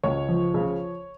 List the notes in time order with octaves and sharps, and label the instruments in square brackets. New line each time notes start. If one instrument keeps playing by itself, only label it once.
[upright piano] C#2 C#5
F3
C#3